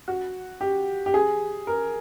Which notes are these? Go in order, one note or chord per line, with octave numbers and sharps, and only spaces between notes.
F#4
G4
G4
G#4
A#4